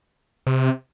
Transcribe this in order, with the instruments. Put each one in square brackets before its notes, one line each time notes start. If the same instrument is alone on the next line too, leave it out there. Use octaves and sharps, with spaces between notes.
[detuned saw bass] C3